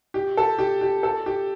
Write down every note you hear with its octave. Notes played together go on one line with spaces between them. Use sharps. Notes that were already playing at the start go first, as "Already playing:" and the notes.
G4
A4
G4
G4
A4
G4